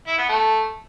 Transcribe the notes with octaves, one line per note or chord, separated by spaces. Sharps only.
E4
B3
A3